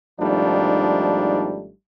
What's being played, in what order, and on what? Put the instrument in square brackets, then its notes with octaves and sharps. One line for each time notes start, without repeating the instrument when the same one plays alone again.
[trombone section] G#1 F3 G3 A3 D4 D#4